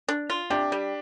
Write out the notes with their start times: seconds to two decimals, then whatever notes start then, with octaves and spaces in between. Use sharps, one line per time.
0.09 D4
0.30 F4
0.50 C3 D4 G4
0.72 G3